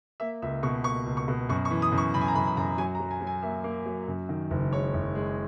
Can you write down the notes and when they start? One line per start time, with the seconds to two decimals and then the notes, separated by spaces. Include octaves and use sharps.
0.20 A#3 E5
0.42 C#2 E5
0.63 B2 C#6
0.84 A#3 C#6
1.06 C#2
1.17 C#6
1.28 B2
1.49 F#2 C#6
1.65 C#6
1.71 E3
1.82 D#6
1.92 F#2
1.98 C#6
2.14 F#2 B5
2.21 G#5
2.28 A#5
2.35 F#2 B5
2.47 B5
2.57 F#2 A#5
2.78 F#3 G#5
2.95 A#5
3.00 F#3
3.11 G#5
3.21 F#3
3.27 G#5
3.43 A#3 E5
3.64 A#3
3.86 F#3
4.08 F#2
4.29 D#3
4.51 F#1
4.72 G#3 C#5
4.94 F#1
5.15 G#3